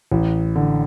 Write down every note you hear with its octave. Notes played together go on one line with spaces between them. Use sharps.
A1
D3